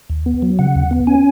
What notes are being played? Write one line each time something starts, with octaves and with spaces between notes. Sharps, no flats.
D#2
B3
F#3
C#3 F#5
D#2
B3
C#4 G#5